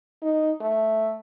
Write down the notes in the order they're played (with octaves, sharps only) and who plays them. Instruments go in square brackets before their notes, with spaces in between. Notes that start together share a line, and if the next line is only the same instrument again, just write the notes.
[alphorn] D#4
A3